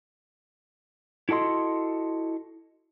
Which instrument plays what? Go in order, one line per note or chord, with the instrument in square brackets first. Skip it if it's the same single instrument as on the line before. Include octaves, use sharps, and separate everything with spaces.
[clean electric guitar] E4 F#4 A4 D#5 C6